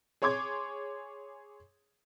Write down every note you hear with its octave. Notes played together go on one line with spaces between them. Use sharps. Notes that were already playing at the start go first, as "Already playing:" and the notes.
G#4 C#5 C6 D6 G#6